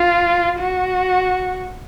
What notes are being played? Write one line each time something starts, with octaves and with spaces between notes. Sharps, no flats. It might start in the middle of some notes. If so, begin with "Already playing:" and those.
Already playing: F4
F#4